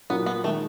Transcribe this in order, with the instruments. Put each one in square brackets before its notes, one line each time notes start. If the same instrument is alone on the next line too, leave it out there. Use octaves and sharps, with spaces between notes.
[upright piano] A#2 F#3 A#3 [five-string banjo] B3
[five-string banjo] B3
[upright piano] D#3 G#3 [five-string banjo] A3